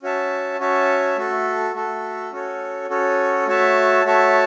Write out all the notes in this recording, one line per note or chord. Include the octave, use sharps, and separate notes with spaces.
C#4 F#4 C#5 E5 A5
C#4 F#4 C#5 E5 A5
A3 F#4 A4
A3 F#4 A4
C#4 F#4 A4 C#5
C#4 F#4 A4 C#5
A3 F#4 C#5 E5 A5
A3 F#4 C#5 E5 A5